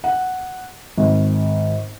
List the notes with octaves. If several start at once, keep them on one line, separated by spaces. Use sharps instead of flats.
F#5
G#1